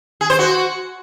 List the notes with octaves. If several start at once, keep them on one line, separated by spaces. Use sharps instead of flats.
G#4
C5
F#4